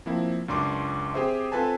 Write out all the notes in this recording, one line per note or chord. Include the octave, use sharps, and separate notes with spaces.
F3 A#3 C4 E4
C#2 F#2 D4 C6 D6
C4 G4 G#4 C5 E5
C4 F4 A4 B4 G#5 A5